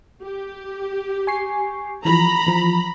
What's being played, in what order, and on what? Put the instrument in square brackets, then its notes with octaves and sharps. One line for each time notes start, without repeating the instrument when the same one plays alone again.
[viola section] G4
[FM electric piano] G#5 C#6 C7
[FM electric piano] E3 F3 [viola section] A#5 B5
[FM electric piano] E3 F3